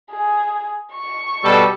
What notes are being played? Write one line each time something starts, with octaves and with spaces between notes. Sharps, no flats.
G#4
C#6
B2 G3 A4